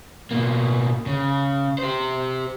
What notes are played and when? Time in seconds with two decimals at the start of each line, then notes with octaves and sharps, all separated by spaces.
0.31 B2 A#3
1.06 C#3
1.78 G4 C5